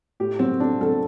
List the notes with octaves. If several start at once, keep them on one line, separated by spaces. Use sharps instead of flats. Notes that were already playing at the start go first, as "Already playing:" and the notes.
A2 G4
F#3 C4
A3 D4
F#3 A4